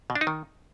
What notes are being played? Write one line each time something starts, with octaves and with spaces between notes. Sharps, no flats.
B2
D4
D#4
D#3